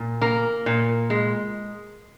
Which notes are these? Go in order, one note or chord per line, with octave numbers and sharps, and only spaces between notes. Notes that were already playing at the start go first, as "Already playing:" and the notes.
Already playing: A#2
A#3 A#4
A#2
G#3